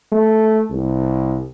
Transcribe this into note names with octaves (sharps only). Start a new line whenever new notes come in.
A3
C2